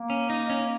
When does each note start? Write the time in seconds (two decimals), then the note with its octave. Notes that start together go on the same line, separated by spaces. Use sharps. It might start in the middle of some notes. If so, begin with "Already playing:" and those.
Already playing: A#3
0.10 C#4
0.30 D#4
0.50 C#4